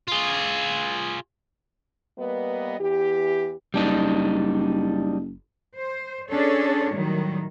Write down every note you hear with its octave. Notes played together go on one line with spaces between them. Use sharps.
F4 G#4
G3 A#3 B3 B4 D#5
E2 E3 G4
F#1 G3 D4 D#4
C5
C#4 D4 G#4 A4 C#5
A2 D#3 F#3 G3